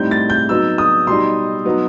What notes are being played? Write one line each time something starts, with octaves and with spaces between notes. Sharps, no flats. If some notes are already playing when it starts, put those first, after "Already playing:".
Already playing: A2 G3 C4 D#4 G6
A6
G6
F#3 B3 D#4 E6
D#6
B2 G3 D#4 C6
F#3 B3 D#4